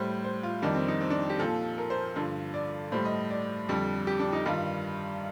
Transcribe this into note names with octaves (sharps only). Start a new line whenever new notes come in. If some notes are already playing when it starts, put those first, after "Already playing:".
Already playing: A2 G3 C5
C5
F4
F2 D#3 G3 D4
C4
D#4
C4
D4
G4
A#2 F3 A4
A#4
C5
G2 D3 F3
D5
A2 G3 C5
D#5
D5
F2 D3 G3
G4
D4
D#4
G2 D#3 G3 F4